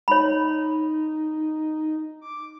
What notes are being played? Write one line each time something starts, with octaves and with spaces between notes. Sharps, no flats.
D#4 C#5 B5
D6